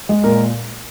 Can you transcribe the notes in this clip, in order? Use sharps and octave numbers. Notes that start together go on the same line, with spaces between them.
G#3
A#2 A#4